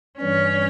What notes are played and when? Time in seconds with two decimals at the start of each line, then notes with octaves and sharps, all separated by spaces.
0.20 G2 E3 G3 C#4